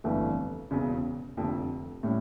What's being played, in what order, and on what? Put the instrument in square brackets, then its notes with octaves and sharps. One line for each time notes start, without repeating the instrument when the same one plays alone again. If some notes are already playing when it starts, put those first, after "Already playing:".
[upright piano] G1 F2 E3 A3 D4
E1 E2 C#3
F1 F2 D3 F3
A2 G3 C#4